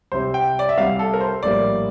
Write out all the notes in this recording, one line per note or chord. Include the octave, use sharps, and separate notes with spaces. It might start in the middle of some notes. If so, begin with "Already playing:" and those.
C2 C3 G3 C5
G5
D5
E5
C2 C3 G3 F5
A4
A#4
C5
A#1 A2 G3 A#3 D5